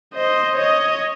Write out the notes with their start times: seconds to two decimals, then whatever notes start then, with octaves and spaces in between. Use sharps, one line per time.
0.15 C5 D#5
0.56 C#5 D#5